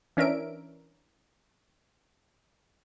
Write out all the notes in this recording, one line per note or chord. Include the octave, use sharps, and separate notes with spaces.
E3 C#4 D4 A#4 E5 D7